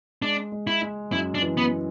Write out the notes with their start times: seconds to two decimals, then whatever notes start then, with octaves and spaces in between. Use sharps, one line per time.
0.22 G#3 D4
0.52 G#3
0.67 E4
0.82 G#3
1.12 F#2 E4
1.35 D4
1.42 E3
1.57 B3